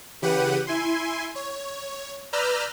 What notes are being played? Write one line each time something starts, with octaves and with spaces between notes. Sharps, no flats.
C#3 E3 G4 B4 F#5 D#7
E4 G#5 C6
C#5
B4 D5 A#5 E6 F6 G6